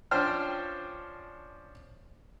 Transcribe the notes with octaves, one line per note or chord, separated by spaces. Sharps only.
F3 C#4 D4 C5 G5 F6